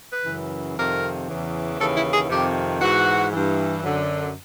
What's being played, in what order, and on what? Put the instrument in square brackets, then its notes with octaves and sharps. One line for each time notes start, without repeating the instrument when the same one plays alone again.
[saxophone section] B4
F#2 C#3 E3
F2 C3 D#3 A#4
E2 C#3 E3
D#2 C#3 E3 A4
E4
G#4
F2 C3 D#3 G4
G#2 E3 F#4
G2 E3
F#2 D3